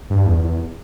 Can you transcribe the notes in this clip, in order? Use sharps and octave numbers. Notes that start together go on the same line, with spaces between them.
G2
E2
E2